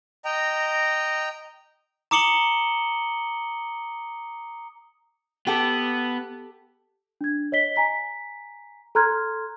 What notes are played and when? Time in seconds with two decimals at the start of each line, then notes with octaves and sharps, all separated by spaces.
0.25 D#5 G5 A#5
2.11 A#5 D6 D#6 C#7 F#7 G7
5.47 B3 G4 A4
7.21 D4 G#6
7.52 C#5 D#5 B6 G7
7.76 G#5 A#5 B6
8.95 A4 A#5 C6 F6 F#6 G#6